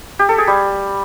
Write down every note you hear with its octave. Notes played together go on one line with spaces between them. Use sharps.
G4
A4
G#4
G3